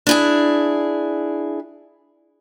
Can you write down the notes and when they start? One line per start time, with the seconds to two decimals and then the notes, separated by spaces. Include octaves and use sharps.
0.07 D4 E4 G#4